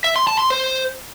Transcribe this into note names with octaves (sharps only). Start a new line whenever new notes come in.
E5
C6
A5
C6
C5